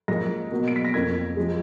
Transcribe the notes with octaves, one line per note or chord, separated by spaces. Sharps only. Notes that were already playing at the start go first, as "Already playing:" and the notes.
G#2 F3 A#3 A#6
B2 F#3 A#3
D7
B6
A#6
F2 F3 A#3 G#6
F3 G#3